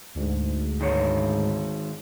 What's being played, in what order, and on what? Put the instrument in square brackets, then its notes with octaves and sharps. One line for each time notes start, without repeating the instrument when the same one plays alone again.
[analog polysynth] D2 G#2
[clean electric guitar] D#3 G#3 C#5